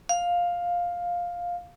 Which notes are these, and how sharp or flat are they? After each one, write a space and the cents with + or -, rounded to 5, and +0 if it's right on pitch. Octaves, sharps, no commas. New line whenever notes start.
F5 +10